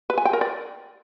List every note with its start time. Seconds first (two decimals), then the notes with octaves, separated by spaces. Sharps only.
0.10 B4
0.18 G#5
0.25 G5
0.33 A#4
0.41 D5